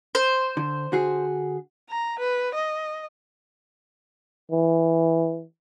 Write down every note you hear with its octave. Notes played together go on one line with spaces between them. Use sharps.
C5
D3
D3 F#4 G#4
A#5
B4
D#5
E3